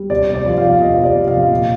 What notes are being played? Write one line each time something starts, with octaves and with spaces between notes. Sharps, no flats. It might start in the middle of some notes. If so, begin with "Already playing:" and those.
Already playing: G3
C3 D5
C3
D5
F3
F5
F3
C3 D#5
C3
D5
F3
F5
F3
A#2